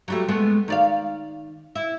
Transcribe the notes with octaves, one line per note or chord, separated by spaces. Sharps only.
F#3 G3 A3
G#3 A3 B3
D#3 D5 F5
E4